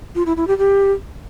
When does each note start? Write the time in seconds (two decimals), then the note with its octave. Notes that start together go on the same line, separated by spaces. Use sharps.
0.15 F4
0.26 E4
0.37 E4
0.47 G4
0.58 G4